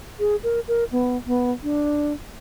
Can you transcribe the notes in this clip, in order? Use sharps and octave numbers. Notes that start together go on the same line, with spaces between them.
G#4
A#4
A#4
B3
B3
D4